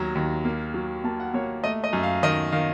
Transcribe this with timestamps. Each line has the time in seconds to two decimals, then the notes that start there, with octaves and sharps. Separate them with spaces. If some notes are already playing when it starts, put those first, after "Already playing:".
Already playing: D#2 F#3 A#5
0.15 D#2
0.45 A#3
0.74 F#3
1.04 A#3 A5
1.20 F#5
1.34 A#3 C#5
1.64 A3 D#5
1.84 D#5
1.93 F#2
2.03 F5
2.23 D#3 D#5
2.52 D#3 F5